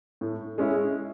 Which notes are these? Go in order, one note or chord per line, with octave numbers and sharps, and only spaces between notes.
A2
G#3 C#4 E4